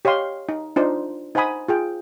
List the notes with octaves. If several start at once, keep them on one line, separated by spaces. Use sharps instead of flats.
G4 C#5 D#5 F5 C6
D#4
D4 D#4 F4 C5
D#4 C5 F#5 G#5 B5 D#6
F4 G#4 G5